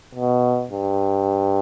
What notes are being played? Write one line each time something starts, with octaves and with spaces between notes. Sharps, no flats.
B2
G2